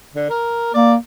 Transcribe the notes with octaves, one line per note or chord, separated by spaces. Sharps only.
D3
A#4
A#3 D5